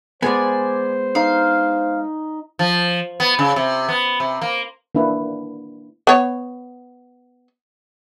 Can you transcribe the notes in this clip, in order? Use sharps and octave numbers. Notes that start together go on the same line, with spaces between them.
G#3 B3 C5 D5 G#5
D#4 F5
F3
B3
C#3
C3
B3
C3
A#3
A#3 D4 E4 B4 D5
B3 C#5